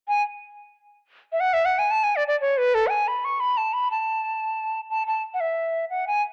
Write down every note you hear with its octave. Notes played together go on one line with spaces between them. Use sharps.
G#5
E5
F#5
E5
F#5
G#5
A5
G#5
D5
D5
C#5
B4
A4
F#5
G#5
B5
C#6
B5
A5
B5
A5
A5
A5
F#5
E5
F#5
G#5